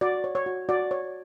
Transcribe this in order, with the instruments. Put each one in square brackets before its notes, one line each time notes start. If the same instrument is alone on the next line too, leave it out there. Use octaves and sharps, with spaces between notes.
[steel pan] F#4 D5
C#5
C#5
F#4
F#4 D5
C#5